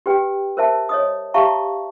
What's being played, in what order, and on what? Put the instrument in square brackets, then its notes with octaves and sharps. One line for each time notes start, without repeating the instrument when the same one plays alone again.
[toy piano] G4 B4 G5
A#4 C5 E5 A5
C#5 D#5 D#6
G4 E5 F5 A5 A#5 C#6